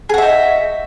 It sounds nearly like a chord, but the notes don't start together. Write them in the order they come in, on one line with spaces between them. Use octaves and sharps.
G#4 F#4 E5 D#4